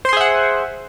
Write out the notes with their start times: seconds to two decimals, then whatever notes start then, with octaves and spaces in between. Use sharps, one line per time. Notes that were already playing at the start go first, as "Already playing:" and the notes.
0.05 C5
0.09 C6
0.13 G#4
0.17 E5
0.21 F#5